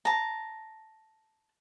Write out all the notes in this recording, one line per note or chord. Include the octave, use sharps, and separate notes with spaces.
A5 A#5